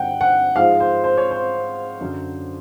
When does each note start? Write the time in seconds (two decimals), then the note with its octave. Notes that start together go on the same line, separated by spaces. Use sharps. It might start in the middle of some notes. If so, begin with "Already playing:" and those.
Already playing: G2 D3 F#3 F#5 G5
0.21 F#5
0.56 G#2 F3 G#3 F5
0.80 C5
1.04 C5
1.18 C#5
1.31 C5
2.01 F#2 D3 F#3